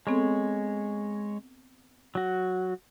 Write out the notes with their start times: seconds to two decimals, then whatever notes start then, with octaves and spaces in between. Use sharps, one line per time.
0.07 G#3 B3 C4 A4 C#5
2.15 F#3 F#4